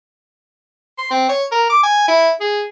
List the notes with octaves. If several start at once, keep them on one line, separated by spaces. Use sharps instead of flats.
C6
C4
C#5
A#4
D6
G#5
E4
G#4